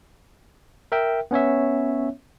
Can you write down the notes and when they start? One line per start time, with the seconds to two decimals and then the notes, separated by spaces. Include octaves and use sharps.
0.92 A#4 E5 G5
1.31 B3 C#4 C#5 E5